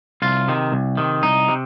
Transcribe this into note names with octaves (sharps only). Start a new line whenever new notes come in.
C2 F4
C3 D#3
C2
C3 D#3
C2 D#4
C3